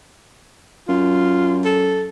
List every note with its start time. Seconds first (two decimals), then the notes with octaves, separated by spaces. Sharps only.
0.88 F#2 F4
1.65 A4